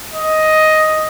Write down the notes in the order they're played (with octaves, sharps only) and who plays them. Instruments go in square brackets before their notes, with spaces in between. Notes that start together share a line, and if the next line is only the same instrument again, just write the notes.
[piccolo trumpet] D#5